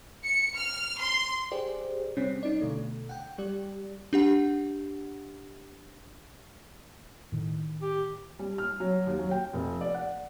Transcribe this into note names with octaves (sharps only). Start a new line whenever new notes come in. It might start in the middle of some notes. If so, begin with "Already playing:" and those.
C#7
F6
C6
G4 G#4 C5 D5
C3 G3 C4 C#4
C#4 D#4 D5
B2 D3 A3
F#5 G5
G3 G4 D5
D4 G4 F#5
A2 D#3
G4
G3
F6
F#3
D#2
F#3
G5
F1
D5
F#5